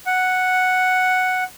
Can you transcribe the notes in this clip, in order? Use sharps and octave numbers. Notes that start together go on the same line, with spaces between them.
F#5